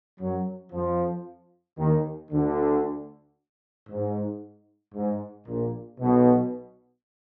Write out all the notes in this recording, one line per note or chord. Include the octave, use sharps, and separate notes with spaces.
F#2 F#3
F2 F3
D#2 D#3
D2 D3
G#2
G#2
A#1 A#2
B1 B2